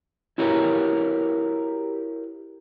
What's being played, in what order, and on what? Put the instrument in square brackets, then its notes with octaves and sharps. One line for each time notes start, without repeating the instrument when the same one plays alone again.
[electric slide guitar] E4 F#4 G4 A#4 B4 C#5